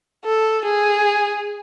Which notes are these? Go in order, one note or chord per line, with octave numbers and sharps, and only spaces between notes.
A4
G#4